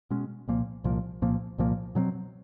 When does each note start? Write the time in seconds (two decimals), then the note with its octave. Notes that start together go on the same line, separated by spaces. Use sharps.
0.11 B2 G#3 C#4
0.48 C2 A#2 F3 A#3
0.84 C2 A#2 F3 A#3
1.22 C2 A#2 F3 A#3
1.58 C2 A#2 F3 A#3
1.95 B2 F#3 A3 C4